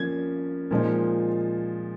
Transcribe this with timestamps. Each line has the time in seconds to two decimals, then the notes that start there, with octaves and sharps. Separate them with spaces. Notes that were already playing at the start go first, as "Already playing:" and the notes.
Already playing: F3 A#3 C#4 G#6
0.71 A#2 F3 G#3 D#4